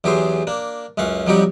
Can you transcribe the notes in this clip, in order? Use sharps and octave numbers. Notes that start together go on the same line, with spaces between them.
E2 F#3 G4 G#4 C5 C6
A#3 D4
C#2 F#2 C#4 F5 F#5
F2 F#3 G3 D#4 G4 F#5